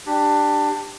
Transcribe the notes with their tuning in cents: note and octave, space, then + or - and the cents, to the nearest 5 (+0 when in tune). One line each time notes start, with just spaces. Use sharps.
D4 +15 G4 +0